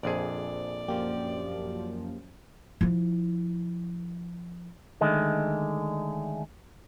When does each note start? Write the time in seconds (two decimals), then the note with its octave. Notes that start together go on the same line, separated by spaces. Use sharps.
0.03 A#1 F2 G#4 D5
0.88 F#2 F3 A#3 G4
2.81 F3 E4
5.01 D3 D#3 G#3 A3